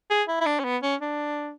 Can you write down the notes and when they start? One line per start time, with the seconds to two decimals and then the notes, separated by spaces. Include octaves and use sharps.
0.10 G#4
0.28 E4
0.41 E4
0.46 D4
0.60 C#4
0.65 B3
0.83 C#4
1.01 D4